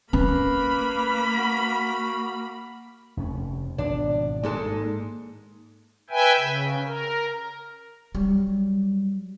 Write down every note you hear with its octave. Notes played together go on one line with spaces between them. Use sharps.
A#3 C#4 B4 B5
F#4
F1 D#2 C#4
G#1 B2 F3 D4
G#2 G#3 A#3 A4
B4 E5 G5 G#5
C#3
A#4
F#3 G3